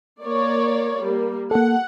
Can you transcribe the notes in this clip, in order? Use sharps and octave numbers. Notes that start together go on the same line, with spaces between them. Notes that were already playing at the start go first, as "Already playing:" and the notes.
A#3 C#5 D5
G3 A#3
A#3 A4 F#5